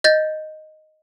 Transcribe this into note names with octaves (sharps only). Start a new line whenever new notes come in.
D#5 G6 A6